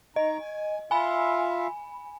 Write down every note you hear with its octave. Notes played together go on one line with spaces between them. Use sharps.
D#4 D#5 A#5
G#5
F4 E5 F5 G#5 B5